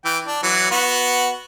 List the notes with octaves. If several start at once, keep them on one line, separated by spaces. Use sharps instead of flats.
E3 G5
D4
E3 F#3
B3 F#4